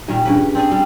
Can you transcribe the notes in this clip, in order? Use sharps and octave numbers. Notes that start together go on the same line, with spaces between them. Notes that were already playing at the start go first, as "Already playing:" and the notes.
A#2 D#3 G3
G2 C#3 B4
C4 D4 G#4
G3